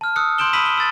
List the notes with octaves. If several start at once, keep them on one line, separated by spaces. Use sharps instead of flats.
A5 F6
D#6 E6 F#6 C#7
C6 G6 D7 E7 G7
B5 D#6 E6 B6 D#7 F#7
G7
E6 A6